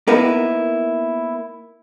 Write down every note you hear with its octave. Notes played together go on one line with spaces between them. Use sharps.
A#3 B3 D#4 E4 A#4 B4